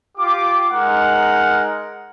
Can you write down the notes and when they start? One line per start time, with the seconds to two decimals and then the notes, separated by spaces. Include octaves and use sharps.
0.18 F4 G4 D6
0.71 G#3 D#4 A#4 F#5